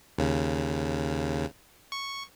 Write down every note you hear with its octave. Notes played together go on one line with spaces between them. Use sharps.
D#2 C#3
C#6